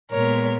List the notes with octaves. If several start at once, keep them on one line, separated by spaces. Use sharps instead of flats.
A#2 G#3 B3 A#4 C#5